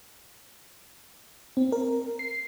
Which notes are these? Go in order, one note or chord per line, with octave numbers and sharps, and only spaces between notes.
C4
A#4
C7